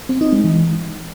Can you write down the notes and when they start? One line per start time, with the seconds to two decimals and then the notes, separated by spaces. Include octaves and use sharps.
0.09 C4
0.21 D#4
0.33 G#3
0.44 E3